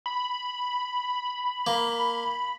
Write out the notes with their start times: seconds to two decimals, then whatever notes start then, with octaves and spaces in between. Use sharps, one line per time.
0.06 B5
1.67 A#3